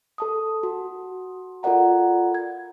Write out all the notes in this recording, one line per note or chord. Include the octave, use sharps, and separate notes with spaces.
A4 A5 D#6
F#4
F4 A4 A#4 D5 F#5 A#5
G#6